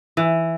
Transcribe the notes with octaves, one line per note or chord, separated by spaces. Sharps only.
E3